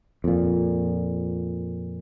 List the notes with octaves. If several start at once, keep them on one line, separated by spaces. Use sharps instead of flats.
F2 A#2